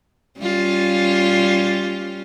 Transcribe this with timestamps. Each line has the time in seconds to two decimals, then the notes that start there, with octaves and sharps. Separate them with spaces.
0.38 G3 C#4 F4